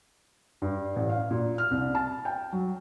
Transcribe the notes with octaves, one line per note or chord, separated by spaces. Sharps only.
G2
A1
F5
A#2
F6
C2
A5
G5
F#3